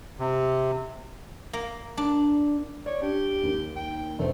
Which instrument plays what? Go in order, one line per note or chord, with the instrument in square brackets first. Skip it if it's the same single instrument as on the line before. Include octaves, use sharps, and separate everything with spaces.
[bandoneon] C3
[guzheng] A#3
D4
[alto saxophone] C#5 [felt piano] D5
[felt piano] D4 [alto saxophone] G4
[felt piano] D#2
[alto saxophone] G5
[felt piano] F1 C5 [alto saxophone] A3